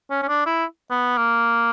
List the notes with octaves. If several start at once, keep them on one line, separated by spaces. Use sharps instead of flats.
C#4
C#4
D4
E4
B3
A#3